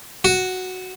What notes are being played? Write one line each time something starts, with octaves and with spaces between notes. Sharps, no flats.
F#4